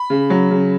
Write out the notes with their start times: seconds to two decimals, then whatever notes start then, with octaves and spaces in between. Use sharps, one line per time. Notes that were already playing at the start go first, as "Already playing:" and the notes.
Already playing: B5
0.10 C#3
0.30 F#3
0.51 C#3